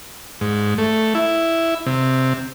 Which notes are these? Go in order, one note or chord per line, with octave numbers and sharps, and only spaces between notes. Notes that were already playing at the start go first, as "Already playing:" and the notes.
G#2
A3
E4
C3